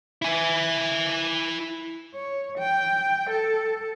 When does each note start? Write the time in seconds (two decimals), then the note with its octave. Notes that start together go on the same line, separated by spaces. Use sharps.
0.22 E4 G#5
2.15 C#5
2.58 G5
3.30 A4